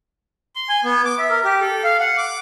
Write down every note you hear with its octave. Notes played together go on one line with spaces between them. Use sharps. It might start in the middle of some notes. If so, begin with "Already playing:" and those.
C6
G#5
B3
D6
E5
A#4
G4
A4
F5
F#5
D6